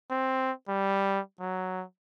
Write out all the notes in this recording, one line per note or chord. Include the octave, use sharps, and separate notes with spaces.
C4
G3
F#3